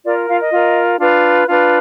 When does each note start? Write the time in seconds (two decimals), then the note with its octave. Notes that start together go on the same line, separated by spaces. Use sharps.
0.04 F4 A#4 D5
0.27 F4 F5
0.39 D#5
0.51 F4 A#4
0.98 D4 F4 B4
1.47 D4 F4 B4